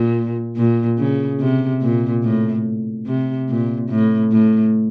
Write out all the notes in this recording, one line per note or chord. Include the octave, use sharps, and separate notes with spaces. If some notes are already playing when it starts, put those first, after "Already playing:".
Already playing: A#2
A#2
C#3
C3
A#2
A2
C3
A#2
A2
A2